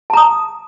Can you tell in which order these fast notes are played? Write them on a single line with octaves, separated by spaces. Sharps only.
A5 A#5 D#6